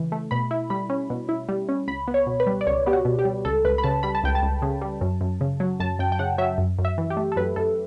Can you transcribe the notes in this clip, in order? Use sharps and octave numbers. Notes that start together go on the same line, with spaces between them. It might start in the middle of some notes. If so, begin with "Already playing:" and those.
Already playing: C#3 E3
A3
B2 B5
E4
G3 B5
C#4
B2
E4
G3
C#4
C#2 B5
B3
C#5
B2
B4
G3
D5
C#2 C#5
B3 G4
F#4
B2
G4
G3
C#2 A4
C#2 B4
B5
C#3 A5
G3 B5
A5
C#2 G5
A5
C#2
C#3
G3
F#2
F#2
C#3
F#3
F#2 A5
F#2 G5
G5
C#3 F#5
F#3 E5
F#2
F#2
E5
E3
G4
A3
A4
F#2 B4
F#2 A4